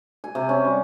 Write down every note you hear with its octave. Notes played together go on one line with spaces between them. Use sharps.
G#5
C3
C#4
G3